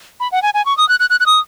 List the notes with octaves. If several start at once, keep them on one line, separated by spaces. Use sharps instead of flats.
B5
F#5
G#5
G#5
C#6
D#6
F#6
F#6
F#6
F#6
D#6